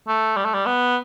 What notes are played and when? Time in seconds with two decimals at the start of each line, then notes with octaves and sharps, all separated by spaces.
0.08 A3
0.37 G3
0.45 A3
0.54 G3
0.66 B3